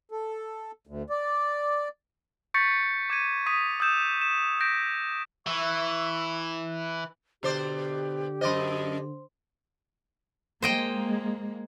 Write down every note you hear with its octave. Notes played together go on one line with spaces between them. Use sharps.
A4
D2
D5
C#6 G6 A6 B6 C#7
D6 G#6 D#7
C#6 D#6 B6 D#7
D#6 E6 G6 E7
E7
G6 A#6 B6 D7
E3 E5 C#6
B2 D3 G4 C5 D5
F#2 C5 D5 D#5 C6
G#3 A#3 C5 D#5 G5